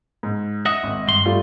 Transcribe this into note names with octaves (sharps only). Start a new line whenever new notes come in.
G#2
D#5 E5 F#5 D#6
G#1
G2 C6
G3 A3 F4